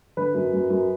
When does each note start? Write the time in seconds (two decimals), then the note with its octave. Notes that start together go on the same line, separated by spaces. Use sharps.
0.17 D3 B4
0.34 F#2
0.53 F#2
0.70 F#2